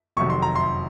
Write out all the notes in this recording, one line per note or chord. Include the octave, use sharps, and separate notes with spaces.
F1 F2 C3 D#3 F#3 C#6
C6
A#5
C6